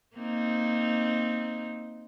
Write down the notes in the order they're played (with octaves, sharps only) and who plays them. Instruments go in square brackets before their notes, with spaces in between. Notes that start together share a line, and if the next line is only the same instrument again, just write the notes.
[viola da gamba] A#3 C4 D#4